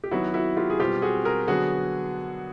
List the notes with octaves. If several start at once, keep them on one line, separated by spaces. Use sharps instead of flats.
G4
D#3 F#3 B3 E4 F#4
E4 F#4
F4 G4
G#4
B2 G3 C4 F4 G4
F#4 G#4
G#4 A#4
D3 F#3 B3 F#4 G#4